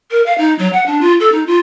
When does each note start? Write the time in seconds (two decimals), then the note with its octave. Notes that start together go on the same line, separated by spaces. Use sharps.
0.11 A#4
0.26 F5
0.38 D#4
0.59 F#3
0.73 F#5
0.86 D4
1.01 F4
1.20 A4
1.32 D#4
1.47 F4